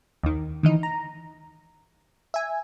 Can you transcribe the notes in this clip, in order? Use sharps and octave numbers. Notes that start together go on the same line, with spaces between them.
D#2 D#3
D#3 E3 D#4
A#5
E5 G#5